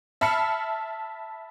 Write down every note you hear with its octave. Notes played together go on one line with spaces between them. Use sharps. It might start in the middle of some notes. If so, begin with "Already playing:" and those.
E5 A5 B5 F6 C7 C#7